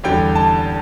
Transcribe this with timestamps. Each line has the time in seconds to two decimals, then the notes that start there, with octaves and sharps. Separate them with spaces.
0.04 E2 D3 G3 G5
0.35 A5